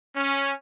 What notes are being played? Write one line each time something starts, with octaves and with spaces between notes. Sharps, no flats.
C#4